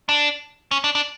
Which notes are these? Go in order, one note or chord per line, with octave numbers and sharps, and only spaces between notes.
D4
C#4
D4
D4